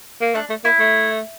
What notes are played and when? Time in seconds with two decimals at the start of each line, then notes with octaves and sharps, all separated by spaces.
0.21 A#3
0.34 A3 D4
0.50 A3
0.64 A#3 E4
0.80 A3